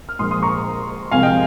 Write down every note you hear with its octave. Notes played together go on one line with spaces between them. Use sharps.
F6
A#1 A#2 F3 G#3 C6 D#6
C6 D#6
A#5 C#6
C2 C3 F3 G#3 F5 G#5
D#5 G5